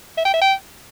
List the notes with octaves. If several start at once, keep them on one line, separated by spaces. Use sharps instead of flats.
E5
G5
E5
G5